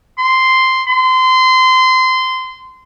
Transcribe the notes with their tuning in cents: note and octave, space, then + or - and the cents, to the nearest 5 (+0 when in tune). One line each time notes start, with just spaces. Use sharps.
C6 -5
C6 -25